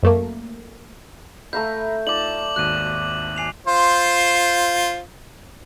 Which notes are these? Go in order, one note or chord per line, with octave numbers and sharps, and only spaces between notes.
F#2 A3 A#3
A3 E5 F5 A#5 B5 G6
D#4 F4 D5 A5 D6 F#7
G#1 D#2 F#4 F#6 D#7
G#5 C7 F7
F4 C5